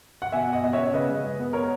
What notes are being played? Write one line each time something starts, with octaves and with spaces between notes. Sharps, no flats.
F#5
B2 E5 G#5
B2
D#5 F#5
B2 D#5
C#4 C#5 E5
C#3 B4 D#5
G#3
G#3
B3
A#4 C#5